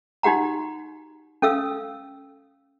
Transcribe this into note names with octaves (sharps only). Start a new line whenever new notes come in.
D#4 F#4 G4 F#5 A#5
C#4 A4 F5 E6